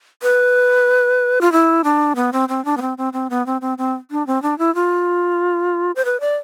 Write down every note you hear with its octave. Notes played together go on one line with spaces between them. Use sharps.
B4
F4
E4
D4
B3
C4
C4
D4
B3
C4
C4
C4
B3
C4
C4
C4
D4
C4
D4
E4
F4
C5
B4
D5